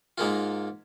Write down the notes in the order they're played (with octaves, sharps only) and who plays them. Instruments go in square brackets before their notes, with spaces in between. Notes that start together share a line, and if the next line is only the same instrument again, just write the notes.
[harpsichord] G#2 G#3 A#3 F4